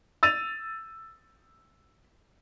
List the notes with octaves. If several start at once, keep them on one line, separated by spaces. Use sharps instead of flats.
E6 A6 D#7 F7